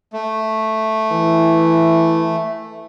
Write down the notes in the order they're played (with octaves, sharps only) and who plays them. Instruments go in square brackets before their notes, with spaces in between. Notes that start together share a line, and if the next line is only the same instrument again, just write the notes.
[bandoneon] A3
[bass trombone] E3